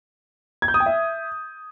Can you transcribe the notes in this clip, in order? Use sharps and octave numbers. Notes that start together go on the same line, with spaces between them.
G#6
G6
D#6
G5
E5